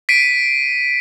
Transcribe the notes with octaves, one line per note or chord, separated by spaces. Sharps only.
B6 C7 D7 D#7